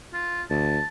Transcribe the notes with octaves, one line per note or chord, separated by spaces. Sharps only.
F4
D2 A5